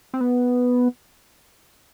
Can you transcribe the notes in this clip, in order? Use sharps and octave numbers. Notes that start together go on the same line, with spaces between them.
C4
B3